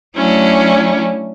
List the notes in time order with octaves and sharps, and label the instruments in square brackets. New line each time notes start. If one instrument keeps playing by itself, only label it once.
[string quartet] F#3 A3 C#4 D4 E4